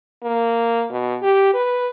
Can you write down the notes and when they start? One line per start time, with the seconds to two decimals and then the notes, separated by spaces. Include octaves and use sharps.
0.23 A#3
0.90 B2
1.22 G4
1.54 B4